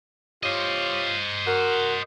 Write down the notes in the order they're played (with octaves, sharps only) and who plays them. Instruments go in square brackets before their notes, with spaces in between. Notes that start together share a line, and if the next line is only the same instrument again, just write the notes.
[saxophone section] F4 G4 C#5 [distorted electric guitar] C5 D#5
[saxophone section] F#4 A#4